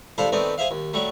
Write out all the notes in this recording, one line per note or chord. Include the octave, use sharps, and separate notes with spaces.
C2 D4 A4 C5 F5 B5
D#3 A3 B3 C4 D5
G#4 C5 E5 F5
D#2
F#3 G3 A3